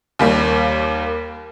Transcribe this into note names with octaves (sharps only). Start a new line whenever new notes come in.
D#2 G3 A#3